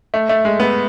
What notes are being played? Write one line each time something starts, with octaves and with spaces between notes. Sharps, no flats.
A3
A3
G#3
B3